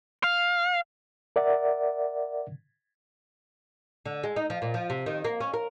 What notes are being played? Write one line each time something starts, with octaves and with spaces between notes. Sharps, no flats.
F5
A#4 D5 E5 F#5
D3
G#3
D#4
F3
A#2
F3
C3
D#3
A#3
C#4
A#4